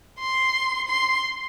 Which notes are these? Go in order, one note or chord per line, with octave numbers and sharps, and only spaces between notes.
C6
C6